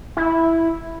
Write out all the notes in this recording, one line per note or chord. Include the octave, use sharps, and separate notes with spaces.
E4